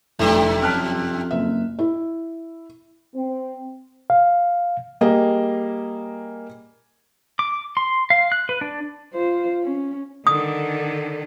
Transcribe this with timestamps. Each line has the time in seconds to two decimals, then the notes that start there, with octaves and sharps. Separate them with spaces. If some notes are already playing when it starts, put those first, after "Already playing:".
0.19 F1 F#2 C3 E3 A3
0.62 F2 C#4 A5 F6 F#6
1.31 F#1 E5
1.79 E4
3.15 C4
4.10 F5
5.01 G3 A#3 G#4 D#5
7.39 D6
7.77 C6
8.10 F5
8.32 F#6
8.49 B4
8.61 D4
9.14 F4 C5
9.63 C#4
10.27 D3 D#3 D#6